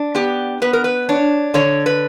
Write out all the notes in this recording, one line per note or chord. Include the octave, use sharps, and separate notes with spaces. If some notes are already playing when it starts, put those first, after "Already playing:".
Already playing: D4
B3 G4
B3 B4
A#4
B4
D4 C#5
D3 C#5
B4